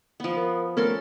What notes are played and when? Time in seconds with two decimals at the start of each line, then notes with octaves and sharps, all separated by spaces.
0.20 F3 B3
0.37 A#4
0.77 A3 B3 C#4 A4 A#4 C6